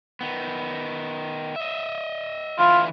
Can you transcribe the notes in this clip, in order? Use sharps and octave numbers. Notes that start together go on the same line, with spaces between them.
D#3 B3
D#5 E5
D3 E3 E4 F4